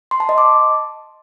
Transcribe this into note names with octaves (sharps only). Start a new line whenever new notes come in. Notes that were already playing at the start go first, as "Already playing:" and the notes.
C6
A5
D#5
D6